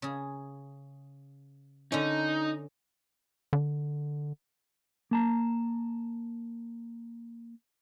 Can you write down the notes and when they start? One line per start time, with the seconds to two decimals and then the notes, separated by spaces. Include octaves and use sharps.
0.02 C#3 G#4
1.92 D3 C#4 D#4
3.53 D3
5.11 A#3 A5 A#5